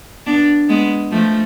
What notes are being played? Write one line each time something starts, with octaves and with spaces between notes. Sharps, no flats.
B3 D4
G#3 B3
F3 A3